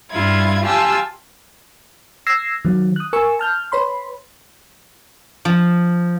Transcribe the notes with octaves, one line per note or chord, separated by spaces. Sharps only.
G2 G3 E4 F4 G#6
F4 G4 G#5 A5 E6
E6 G#6 A#6 C7
D#3 F#3
D#6 F#6
A#4 G#5 C#6 E6
A5 F6 G6
B4 C#5 B5 C6
F3